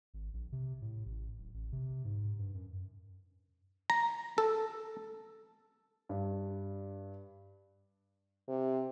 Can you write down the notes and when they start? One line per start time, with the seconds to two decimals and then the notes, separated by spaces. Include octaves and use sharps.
0.14 G#1
0.33 A#1
0.52 C3
0.82 A2
1.06 A1
1.38 D1
1.54 A1
1.72 C3
2.04 G#2
2.39 G2
2.54 F#2
3.90 A#5
4.38 A4
6.09 G2
8.48 C3